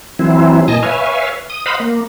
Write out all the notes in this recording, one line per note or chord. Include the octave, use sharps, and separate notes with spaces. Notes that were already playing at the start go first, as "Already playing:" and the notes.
E3 F#3 C4 E4
A#2 D#5 G#5 A5 A#6
B4 C#5 E5 F5 G#5
D#6
C5 D#5 F5 F#5 B5
A#3